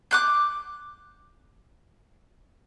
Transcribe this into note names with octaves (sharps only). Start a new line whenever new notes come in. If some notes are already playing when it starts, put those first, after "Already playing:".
D6 F#6 G6